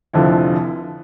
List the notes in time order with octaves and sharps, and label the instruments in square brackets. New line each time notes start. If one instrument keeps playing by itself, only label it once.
[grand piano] F1 F2 D3 F3 E4